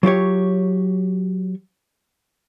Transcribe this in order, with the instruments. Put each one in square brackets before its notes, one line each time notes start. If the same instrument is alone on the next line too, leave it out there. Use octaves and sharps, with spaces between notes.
[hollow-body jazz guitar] F#3 F4 G4 C#5